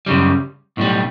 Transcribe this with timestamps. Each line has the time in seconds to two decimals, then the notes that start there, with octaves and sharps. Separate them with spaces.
0.06 F#2 C#3 G3
0.77 B1 A2 G3